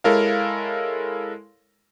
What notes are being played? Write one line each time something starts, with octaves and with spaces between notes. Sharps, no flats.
G#3 E4 A4 A#4 C#5 F5